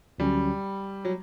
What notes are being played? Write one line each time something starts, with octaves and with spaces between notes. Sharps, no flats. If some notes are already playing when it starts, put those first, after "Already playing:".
D2 D3 F#3 G3 C#4 F#4
F#3